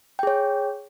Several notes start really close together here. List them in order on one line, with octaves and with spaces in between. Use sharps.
G5 G#4 C#5